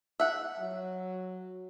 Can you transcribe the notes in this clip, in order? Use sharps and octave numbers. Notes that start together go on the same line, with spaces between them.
E5 F#5
F#3